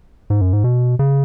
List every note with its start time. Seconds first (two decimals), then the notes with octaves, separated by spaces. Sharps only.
0.30 G#2
0.41 F#2
0.53 G#2
0.64 B2
0.99 C#3